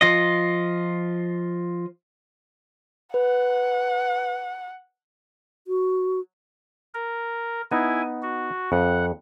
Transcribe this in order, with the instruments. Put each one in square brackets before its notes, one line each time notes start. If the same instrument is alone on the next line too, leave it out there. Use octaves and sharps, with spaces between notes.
[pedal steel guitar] F3 F4 D#5
[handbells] B4 [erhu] F#5
[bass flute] F#4
[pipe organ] A#4
[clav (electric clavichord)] B3 D#4 [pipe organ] E4 G#5
[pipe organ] F#4
[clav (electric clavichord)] F2 [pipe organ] F#5